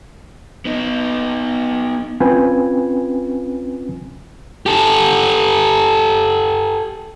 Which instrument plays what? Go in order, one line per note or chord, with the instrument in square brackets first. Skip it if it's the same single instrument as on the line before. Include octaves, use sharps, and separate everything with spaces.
[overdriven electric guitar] B3 D#4
[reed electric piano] C4 C#4 F4 B4 G5 G#5
[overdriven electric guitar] G4 A4